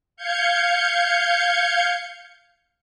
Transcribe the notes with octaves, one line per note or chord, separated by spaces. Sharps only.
F5 G6 G#6 C#7